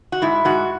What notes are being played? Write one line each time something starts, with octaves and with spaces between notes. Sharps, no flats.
F#4
G#2 E4
G#2 F#4